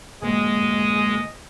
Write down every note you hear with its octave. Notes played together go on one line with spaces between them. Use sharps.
D1 F#2 G#3 A#3 G#4 D#5